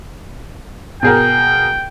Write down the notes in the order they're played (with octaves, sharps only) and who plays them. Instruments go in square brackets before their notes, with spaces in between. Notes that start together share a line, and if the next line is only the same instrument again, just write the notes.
[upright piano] B2 G#4 A#4 [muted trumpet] G5